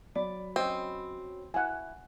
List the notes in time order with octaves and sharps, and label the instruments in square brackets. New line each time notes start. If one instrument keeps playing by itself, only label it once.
[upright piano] F#3 B5 [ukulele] D5
[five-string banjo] C4 [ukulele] C#4 D#5
[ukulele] E4 [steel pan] F#5 G#5